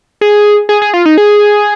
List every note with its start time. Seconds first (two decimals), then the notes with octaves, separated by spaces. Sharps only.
0.21 G#4
0.69 G#4
0.82 G#4
0.94 F4
1.05 D#4
1.18 G#4